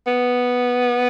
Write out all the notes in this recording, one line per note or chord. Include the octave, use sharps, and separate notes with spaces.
B3